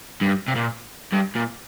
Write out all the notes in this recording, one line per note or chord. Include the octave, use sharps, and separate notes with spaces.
G2
C3
A#2
G2
A#2